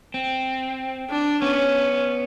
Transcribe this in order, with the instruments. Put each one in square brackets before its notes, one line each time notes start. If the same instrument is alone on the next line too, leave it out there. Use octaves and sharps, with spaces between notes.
[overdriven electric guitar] C4
[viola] D4
[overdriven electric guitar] B3 [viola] C#4